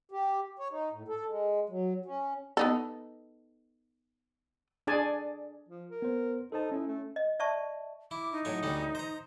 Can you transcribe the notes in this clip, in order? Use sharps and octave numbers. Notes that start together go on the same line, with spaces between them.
G4
C#5
D#4
A2
A4
G#3
F#3
C#4
B3 D#4 A4
D4 G#4 D5 G#5 A5
F3
A#4
B3 C5
D#4 A4 C5 A5
C#4 E4
A3
D#5
D5 E5 A5 C#6
E4 D6
D#4
A2 F#3 G#5
D2 G3 C#4
C5 A#5